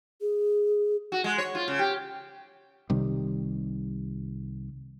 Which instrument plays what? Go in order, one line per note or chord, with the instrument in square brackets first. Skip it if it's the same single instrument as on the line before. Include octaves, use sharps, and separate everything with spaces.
[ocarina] G#4
[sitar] F#4
G#3
C#5
F4
C#3
G4
[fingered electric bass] C2 C3 D#3 G3